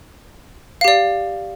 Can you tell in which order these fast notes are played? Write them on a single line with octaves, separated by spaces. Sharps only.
F5 G4 D5